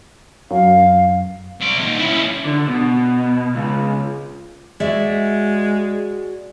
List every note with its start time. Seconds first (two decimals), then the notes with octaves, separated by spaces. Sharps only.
0.51 F#2 F5
1.61 C2 D5
1.78 A#2 D#4
2.00 C#4 E4
2.45 D3
2.67 B2
3.55 C#2
4.80 G#3 F#4 D5 E5